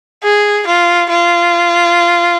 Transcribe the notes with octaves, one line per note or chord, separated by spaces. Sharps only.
G#4
F4
F4